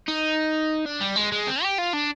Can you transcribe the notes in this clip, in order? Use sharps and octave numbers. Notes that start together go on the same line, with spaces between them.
D#4
D4
G3
G#3
G#3
C4
G4
F4
D4